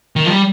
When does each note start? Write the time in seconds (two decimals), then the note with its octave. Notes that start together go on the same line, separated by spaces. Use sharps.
0.16 D#3
0.25 F3
0.30 G3